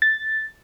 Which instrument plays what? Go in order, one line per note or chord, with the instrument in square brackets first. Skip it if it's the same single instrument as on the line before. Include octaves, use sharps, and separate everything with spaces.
[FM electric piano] A6